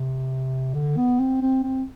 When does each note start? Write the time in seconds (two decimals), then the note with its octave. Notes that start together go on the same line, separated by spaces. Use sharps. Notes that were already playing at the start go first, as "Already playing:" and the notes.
Already playing: C3
0.74 D3
0.97 B3
1.19 C4
1.41 C4
1.63 C4